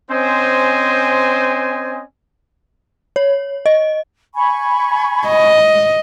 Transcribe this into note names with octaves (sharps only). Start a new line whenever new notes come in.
C4 C#4 C5 D#5 G#5
C#5
D#5
G#5 B5 C#6
D#5